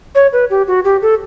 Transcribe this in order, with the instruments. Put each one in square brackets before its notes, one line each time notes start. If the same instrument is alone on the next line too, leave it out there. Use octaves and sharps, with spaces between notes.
[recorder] C#5
B4
G4
F#4
G4
A4